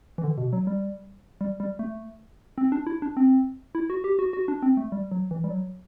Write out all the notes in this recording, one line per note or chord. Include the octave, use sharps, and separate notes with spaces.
E3
D3
B2
F#3
G3
G3
G3
A3
C4
D4
E4
D4
C4
E4
F#4
G4
F#4
F#4
D4
C4
A3
G3
F#3
E3
G3
F#3